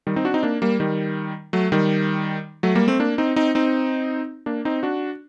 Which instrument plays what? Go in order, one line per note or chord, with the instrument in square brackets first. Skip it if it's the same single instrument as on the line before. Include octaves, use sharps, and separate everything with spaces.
[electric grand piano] D#3 G3
C4 D#4
D4 F#4
C4 D#4
A#3 D4
G3 A#3
D#3 G3
F#3 A3
D#3 G3
F#3 A3
G3 A#3
A3 C4
A#3 D4
C4 D#4
C4 D#4
C4 D#4
A#3 D4
C4 D#4
D4 F#4